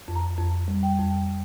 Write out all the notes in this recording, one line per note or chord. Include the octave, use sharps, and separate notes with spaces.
F2
A#5
F2
G3
G5
F2